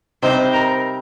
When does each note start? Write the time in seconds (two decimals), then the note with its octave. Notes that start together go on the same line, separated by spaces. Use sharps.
0.22 C3 G3 C4 D#4 C5
0.53 A#4